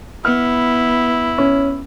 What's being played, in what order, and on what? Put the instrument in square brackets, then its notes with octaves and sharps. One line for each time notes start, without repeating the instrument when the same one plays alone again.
[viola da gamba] B3 [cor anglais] E4 [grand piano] F6
[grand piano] C#4